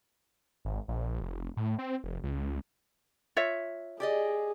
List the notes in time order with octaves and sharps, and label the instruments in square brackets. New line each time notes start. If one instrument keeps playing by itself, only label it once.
[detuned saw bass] G#1
A#1
F1
A2
C4
F1
C#2
[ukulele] F4 C#5 E5
[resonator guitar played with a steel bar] G4 D5 D#5 [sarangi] G#4